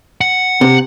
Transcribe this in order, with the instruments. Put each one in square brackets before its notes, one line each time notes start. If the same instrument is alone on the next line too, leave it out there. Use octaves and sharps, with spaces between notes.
[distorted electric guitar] F#5
[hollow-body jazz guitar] C3